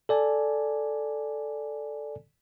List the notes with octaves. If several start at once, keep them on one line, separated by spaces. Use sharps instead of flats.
A4 D5 G#5 A5